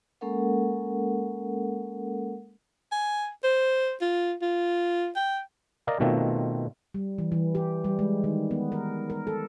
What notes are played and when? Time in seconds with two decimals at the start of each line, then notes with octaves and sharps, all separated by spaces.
0.21 G#3 A#3 C#4 A4 A#4 F#5
2.92 G#5
3.44 C5
4.01 F4
4.42 F4
5.16 G5
5.87 A#4 D5 D#5 F5
6.00 B2 D#3 A3 C4 F4
6.94 G3
7.18 E3
7.32 E3
7.55 G4
7.84 G3
7.99 G#3
8.24 D#3
8.51 B3
8.72 A#4
9.10 A#4
9.27 A4